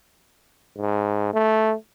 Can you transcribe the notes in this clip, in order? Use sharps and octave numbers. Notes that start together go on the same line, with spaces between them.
G#2
A3